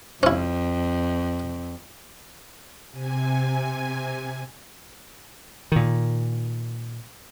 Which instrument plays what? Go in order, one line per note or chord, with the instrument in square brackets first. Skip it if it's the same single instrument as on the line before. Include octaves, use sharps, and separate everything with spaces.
[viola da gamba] F2 [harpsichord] C#4 E4
[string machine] C3 G#5
[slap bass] A#2 D#3